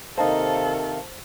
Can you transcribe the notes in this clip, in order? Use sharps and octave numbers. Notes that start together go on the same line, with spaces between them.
C3 D#3 A#3 D#4 A4 C5 F5 A5